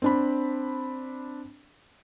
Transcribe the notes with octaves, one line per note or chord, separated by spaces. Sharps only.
C4 D4 B5